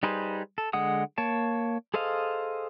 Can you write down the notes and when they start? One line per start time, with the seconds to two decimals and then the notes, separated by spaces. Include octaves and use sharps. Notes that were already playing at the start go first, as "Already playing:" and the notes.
0.03 G3 D#4 G#4 B4 C5
0.58 A4
0.73 D3 G#3 F#5 D#6
1.18 A#3 C#5 A5
1.94 G#4 A4 C5 D#5 F5